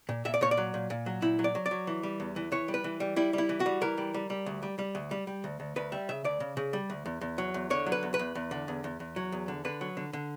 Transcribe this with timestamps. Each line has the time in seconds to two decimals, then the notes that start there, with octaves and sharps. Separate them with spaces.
0.09 A#2
0.25 A#2 E5
0.34 D5
0.41 A#2 C#5
0.51 D5
0.57 F#3
0.74 A#2
0.90 A#2
1.06 F#3
1.22 A#2 E4
1.39 F#3
1.44 D5
1.55 F#3
1.66 D5
1.71 F#3
1.87 E3
2.03 G3
2.20 E2
2.36 E3
2.52 E3 C#5
2.68 G3
2.74 B4
2.84 E3
3.00 G3
3.16 G3 E4
3.33 G3 E4
3.49 E3
3.60 F#4
3.66 G3
3.82 E3 A#4
3.98 G3
4.14 G3
4.30 G3
4.46 D2
4.63 G3
4.79 G3
4.95 D2
5.11 G3
5.27 G3
5.44 D2
5.60 D2
5.76 D2 B4
5.92 G3 E5
6.09 C#3 E5
6.24 D2 D5
6.40 C#3
6.57 C#3
6.73 G3
6.90 D2
7.06 E2
7.21 E2
7.38 F#3
7.54 E2
7.70 D3 C#5
7.86 F#3
7.92 B4
8.03 E2
8.14 B4
8.19 E2
8.35 E2
8.51 D3
8.68 E2
8.84 E2
9.00 E2
9.16 F#3
9.32 E2
9.48 D3
9.65 D3 B4
9.81 F#3
9.97 D3
10.13 D3